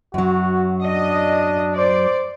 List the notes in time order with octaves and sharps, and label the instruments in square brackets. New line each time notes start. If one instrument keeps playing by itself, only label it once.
[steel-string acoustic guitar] F#2 F#3 [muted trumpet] F#4
[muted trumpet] D4 [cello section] D#5
[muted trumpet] C5 [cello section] D5